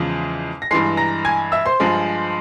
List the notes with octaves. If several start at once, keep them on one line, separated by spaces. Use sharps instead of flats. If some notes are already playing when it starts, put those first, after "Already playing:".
Already playing: E2 C#3 F3 G#3
A#6
G2 E3 G#3 C6 C7
A#5 A#6
G#5 G#6
E5 E6
C5 C6
G2 F3 G#3